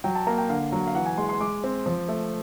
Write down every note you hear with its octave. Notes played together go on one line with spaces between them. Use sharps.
F#3 G5
A5
A#3 A#5
G5
D3 F5
F#3
F5
E3 F#5
G#5
G#3 C6
C6
G#3 D6
C4
F3
A3